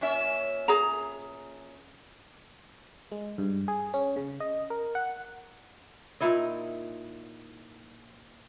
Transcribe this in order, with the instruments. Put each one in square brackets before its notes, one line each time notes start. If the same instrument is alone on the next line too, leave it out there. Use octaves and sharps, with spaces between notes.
[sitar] A#2 C#4 E5
[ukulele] G#4 A#5
[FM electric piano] G#3
G2
G#4
C#4
C#3
D#5
A#4
F#5
[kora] A#2 D#4 E4 D#5